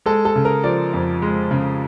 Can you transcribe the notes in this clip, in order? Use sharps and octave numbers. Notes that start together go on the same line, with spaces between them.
G#3 A4
A4
C#3
A#4
F3 D5
F2
G#3
C#3